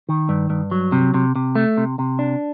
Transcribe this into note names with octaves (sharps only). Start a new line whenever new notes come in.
D#3
G2
G2
F#3
C3
C3
C3
A3
C3
C3
D4